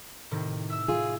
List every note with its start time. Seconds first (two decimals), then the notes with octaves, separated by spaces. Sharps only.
0.31 A2 C3 D#3
0.70 E5 E6
0.88 F4 G#4